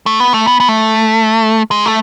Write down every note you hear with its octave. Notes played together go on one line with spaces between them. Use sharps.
A3
B3
A3
B3
B3
A3
G#3
A3